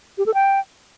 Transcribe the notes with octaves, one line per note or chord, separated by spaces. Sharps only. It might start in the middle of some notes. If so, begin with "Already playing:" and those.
G4
A4
G5